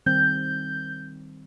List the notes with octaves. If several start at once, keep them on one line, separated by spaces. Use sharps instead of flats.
D#3 G3 C4 G6